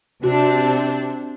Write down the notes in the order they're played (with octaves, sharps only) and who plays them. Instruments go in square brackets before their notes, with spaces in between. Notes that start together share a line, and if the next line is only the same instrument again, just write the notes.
[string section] C3 C4 D4 [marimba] F#4